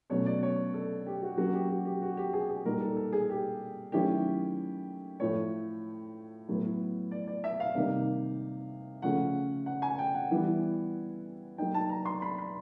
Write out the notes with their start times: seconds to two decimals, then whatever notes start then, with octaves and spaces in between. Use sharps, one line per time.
0.10 B2 F#3 A3 C#4 C#5
0.26 D5
0.43 C#5
0.74 A4
1.06 G4
1.22 F#4
1.37 F#3 A#3 C#4 F#4
1.53 G4
1.69 F#4
1.85 G4
2.02 F#4
2.17 G4
2.33 G#4
2.49 G#4
2.65 A#2 G3 A#3 D#4 A#4
2.81 A4
2.97 A4
3.13 G#4
3.30 G4
3.92 D#3 F#3 A3 C#4 E4 G4
5.20 A2 F3 A3 C#5
6.48 A2 F#3 B3
7.11 D5
7.27 D5
7.44 E5
7.60 F5
7.75 C3 D#3 G3 A#3 D#4
9.02 C#3 F3 A3 C#4 F#5
9.66 F#5
9.82 G#5
9.99 G5
10.15 F#5
10.31 E3 G3 B3 E4
11.58 F#3 A#3 D#4 G5
11.74 A5
11.90 A#5
12.06 C6
12.22 B5
12.38 B5